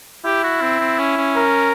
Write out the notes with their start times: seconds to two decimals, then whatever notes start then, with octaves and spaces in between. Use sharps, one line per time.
0.25 E4 G4
0.44 F#4
0.61 C4
0.80 C4
0.99 C#4
1.17 C#4
1.36 A#4